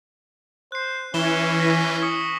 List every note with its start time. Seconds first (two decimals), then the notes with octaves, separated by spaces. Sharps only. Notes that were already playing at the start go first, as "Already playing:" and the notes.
0.72 C5 F#6 C7
1.14 E3 C#4 E7 G7
1.60 A#6 B6 D#7
2.02 C#6 D#6 C#7